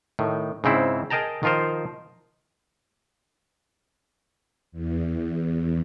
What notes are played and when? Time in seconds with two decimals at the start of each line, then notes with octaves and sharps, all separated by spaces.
0.19 A2 D#3
0.64 G#2 C#3 C4 E4
1.10 G#4 A#4 D#5 G5 A5 A#5
1.43 D#3 F3 F4 A#4 C5
4.72 E2